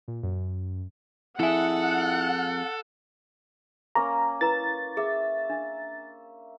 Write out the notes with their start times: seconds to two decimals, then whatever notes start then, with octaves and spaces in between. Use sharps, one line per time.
0.08 A#2
0.23 F#2
1.40 F2 E4 G#4 A4 E5 F#5
3.95 A#3 C#4 A#4 A#5
4.41 E4 B4 A#5 A6
4.97 G#4 E5
5.50 D4